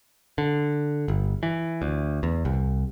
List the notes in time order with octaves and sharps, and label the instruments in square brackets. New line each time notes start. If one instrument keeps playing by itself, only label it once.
[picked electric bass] D3
G1
E3
D2
E2
C2